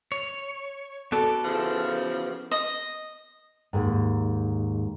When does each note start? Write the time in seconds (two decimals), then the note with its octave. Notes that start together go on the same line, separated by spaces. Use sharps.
0.12 C#5
1.12 B3 F#4 A4 D5
1.44 C#3 E3 F3
2.51 D#5
3.73 D#2 G#2